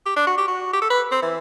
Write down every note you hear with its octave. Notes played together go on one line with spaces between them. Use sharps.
G4
D4
F#4
G4
F#4
G4
A4
B4
C4
E3